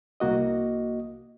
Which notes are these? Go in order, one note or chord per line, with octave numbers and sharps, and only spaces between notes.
C2 A#3 F#4 D#5